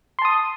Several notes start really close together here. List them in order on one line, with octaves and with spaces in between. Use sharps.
C6 A5 D#6